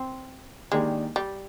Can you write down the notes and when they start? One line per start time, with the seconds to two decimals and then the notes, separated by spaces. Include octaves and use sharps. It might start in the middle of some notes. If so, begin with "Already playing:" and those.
Already playing: C4
0.72 D#3 G#3 A#3 D4 G4
1.16 G3